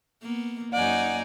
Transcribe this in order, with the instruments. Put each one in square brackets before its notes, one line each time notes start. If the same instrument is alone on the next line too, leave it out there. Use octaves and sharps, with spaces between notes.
[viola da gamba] A#3 B3
[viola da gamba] F#2 A#3 D#4 [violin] D5 G#5 [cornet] F#5